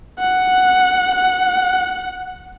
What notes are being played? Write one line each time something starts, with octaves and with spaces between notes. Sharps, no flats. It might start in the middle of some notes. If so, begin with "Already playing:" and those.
F#5
F#5